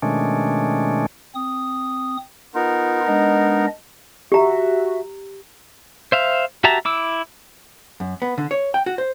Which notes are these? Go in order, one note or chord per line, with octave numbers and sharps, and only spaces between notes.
B2 D#3 G#3 A3 C#4 D4
C4 D#6
B3 D#4 F4 A#4
G#3 D4 D#5
F#4 G4 E5 A#5
C5 E5 F5
F#4 G4 E5 A5 A#5
E4 D6 E6
F#2
B3
D3
C#5
G5
F#4
C5